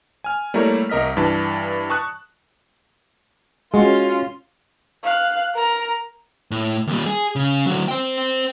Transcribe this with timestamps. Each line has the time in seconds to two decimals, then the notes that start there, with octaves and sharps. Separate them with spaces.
0.24 G#5 F6
0.54 G3 A3 A#3 E4 A#4 C#5
0.89 C2 A#4 D#5 F6 B6
1.17 G2 E3 A5
1.90 A5 C#6 D#6 F#6
3.74 G#3 C#4 F4 F#4 F5 F#5
5.03 F5 F#6
5.54 A#4 A#5
6.51 A2
6.87 D#2 G3
7.06 G#4
7.36 C#3
7.67 D3 F#3
7.88 C5 G5